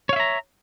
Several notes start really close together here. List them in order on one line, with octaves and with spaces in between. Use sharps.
C#5 F5 E5 A#5